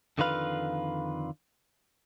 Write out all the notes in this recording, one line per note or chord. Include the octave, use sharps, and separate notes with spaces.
F2 D3 D#3 F4 B4 F5